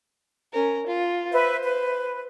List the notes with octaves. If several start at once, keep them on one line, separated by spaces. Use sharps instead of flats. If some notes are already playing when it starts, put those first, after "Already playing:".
C#4 A#4
F4
B4 C5 E5
B4